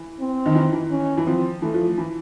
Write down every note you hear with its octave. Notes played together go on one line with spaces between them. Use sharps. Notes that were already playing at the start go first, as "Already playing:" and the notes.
Already playing: E3
C4
D#3
E3
E3
C#4
E3
F3 C4
E3 A3
F3
E3